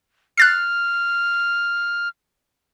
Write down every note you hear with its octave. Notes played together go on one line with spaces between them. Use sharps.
F6 F#6 A6 C7